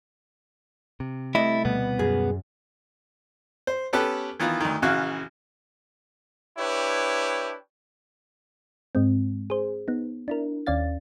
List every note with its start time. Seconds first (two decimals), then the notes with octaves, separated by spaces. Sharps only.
1.00 C3
1.35 C2 A3 E4 D#5
1.65 D2 B2 G3 B3
1.99 F#2 G#4
3.67 C5
3.93 B3 C#4 G4 A4 B4
4.40 D#3 E3 B3 F4
4.60 D2 D#3
4.82 A#1 C#3 E3 F#4 F5 F#6
6.58 D4 E4 G4 B4 C#5 G5
8.95 G#2 G#3 C4
9.50 G#4 C5
9.88 B3 D#4
10.28 D4 E4 A#4
10.67 D#2 C#4 D5 F5 A6